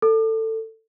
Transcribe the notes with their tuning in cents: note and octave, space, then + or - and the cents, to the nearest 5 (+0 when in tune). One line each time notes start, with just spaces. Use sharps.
A4 +20